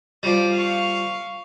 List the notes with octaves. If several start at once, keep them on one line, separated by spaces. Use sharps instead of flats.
F3 G3 D5
F5 C#6